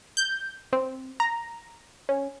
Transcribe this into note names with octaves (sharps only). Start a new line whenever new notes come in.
G6
C4
A#5
C#4